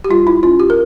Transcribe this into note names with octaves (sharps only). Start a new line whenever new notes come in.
G4
G3 F4
E4
C#4 F4
G4
A#4